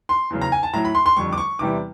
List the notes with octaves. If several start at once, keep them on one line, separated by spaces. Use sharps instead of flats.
C6
E2 C#3 F#3
A#5
G#5
A5
A2 F#3 A#5
B5
C6
C6
F2 D3 G3 C#6
D6
C#6
E2 C3 E3 G3 D6